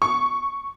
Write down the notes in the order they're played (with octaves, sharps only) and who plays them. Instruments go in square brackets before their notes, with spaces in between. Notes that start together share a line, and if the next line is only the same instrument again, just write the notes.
[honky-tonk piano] C#6